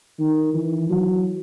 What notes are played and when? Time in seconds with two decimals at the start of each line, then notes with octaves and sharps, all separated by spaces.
0.19 D#3
0.54 E3
0.89 F#3